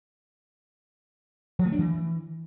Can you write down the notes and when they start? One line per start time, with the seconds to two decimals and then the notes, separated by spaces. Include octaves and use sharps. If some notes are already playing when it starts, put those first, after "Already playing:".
1.59 F3
1.66 A3
1.72 D4
1.79 E3